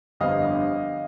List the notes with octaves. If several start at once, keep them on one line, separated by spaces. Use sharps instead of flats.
G1 F2 D3 G3 B3 D#5 F5